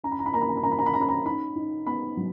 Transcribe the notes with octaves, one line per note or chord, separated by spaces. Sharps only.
C#4 A#5
B5
A#5
B5
A#3 A#5
B5
A#5
B5
A#3 A#5
B5
A#5
B5
C#4 A#5
B5
A#5
D#4 B5
D#4
B3 B5
F#3